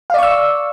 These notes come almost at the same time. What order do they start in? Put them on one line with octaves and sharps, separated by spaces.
F5 D5 C#6 E6